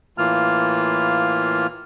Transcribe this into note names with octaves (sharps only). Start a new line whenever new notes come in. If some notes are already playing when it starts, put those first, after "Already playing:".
A2 E3 A#3 F4 F6